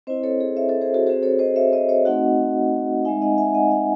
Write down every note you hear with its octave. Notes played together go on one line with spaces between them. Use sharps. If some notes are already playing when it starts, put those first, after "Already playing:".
C4 E4 C5 D#5
A4 C#5
G#4
C#5 E5
A4 C#5
G#4 C5
F#4 A4
C4 F#4 G#4 C5
A4 C#5
C5 D#5
C#5 E5
C5 D#5
C#5 E5
A3 C4 D#4 F#4 D#5 F#5
G#3 C4 D#4 E5 G#5
D#5 F#5
E5 G#5
D#5 F#5
D#5 F#5